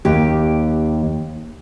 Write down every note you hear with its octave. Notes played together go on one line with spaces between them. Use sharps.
D#2 G4